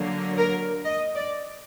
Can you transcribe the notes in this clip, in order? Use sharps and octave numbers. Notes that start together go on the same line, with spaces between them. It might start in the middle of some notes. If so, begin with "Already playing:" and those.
Already playing: D3 F#3 A#3
A#4
D#5
D5